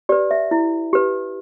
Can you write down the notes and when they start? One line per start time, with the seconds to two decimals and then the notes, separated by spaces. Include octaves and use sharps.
0.09 G4 D5
0.12 B4
0.31 E5
0.51 E4
0.93 G4 B4